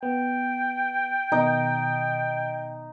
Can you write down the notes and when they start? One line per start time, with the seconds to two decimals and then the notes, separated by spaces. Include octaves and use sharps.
0.03 B3 G5
1.32 B2 D#3 D#4